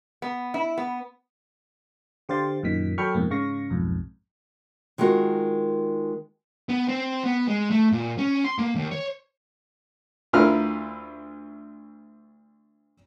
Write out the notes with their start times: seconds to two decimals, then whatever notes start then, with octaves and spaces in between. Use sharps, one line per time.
0.22 B3
0.54 E4
0.78 B3
2.29 D3 G4 C5 F5 C6 A6
2.63 F#2 A#2 D#3 B6
2.98 F#3 A4 G5 B5 C#6 F6
3.14 F2 G#2 B2 A#3
3.30 G#2 C#3 F5 C#6 A#6
3.70 B1 F2 G#2
4.98 D#3 G#3 F4 F#4 A#4
6.69 B3
6.88 C4
7.24 B3
7.48 G#3
7.71 A3
7.92 A#2
8.18 C#4
8.44 C6
8.58 A#3
8.75 D#2
8.91 C#5
10.33 D2 E4 F4 A#4 B4 F6